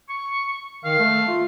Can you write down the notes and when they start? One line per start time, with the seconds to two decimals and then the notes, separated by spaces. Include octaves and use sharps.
0.09 C#6
0.84 D#3 F5
0.99 A3
1.28 F4